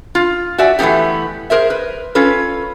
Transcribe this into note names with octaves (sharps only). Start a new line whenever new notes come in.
F4
F#4 D5 E5 G#5
E3 A3 B3 D#4 G4
G#4 A#4 C5 E5
B4
C#4 F4 A4 B4